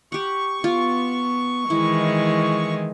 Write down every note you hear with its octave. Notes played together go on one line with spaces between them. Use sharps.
G4 F#5 C#6
B3 F4 D6
D#3 E3 G#3 E4